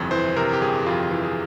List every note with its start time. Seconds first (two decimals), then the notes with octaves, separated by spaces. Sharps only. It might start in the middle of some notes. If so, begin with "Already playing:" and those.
Already playing: G1 F2 C3 E3
0.11 E3 C5
0.36 C3 A#4
0.53 G4
0.61 G1 G#4
0.86 F2 F4
1.11 E3
1.23 G#4